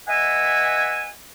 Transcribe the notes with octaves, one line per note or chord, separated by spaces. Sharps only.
B4 D#5 E5 F#5 G#5